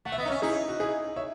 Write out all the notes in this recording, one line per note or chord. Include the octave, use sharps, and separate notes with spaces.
A3 F#5
E5
B3 D#5
D#4
C#4 C#5 E5
D#4 E4 G#4
F#4
E4 G#4
C#5 E5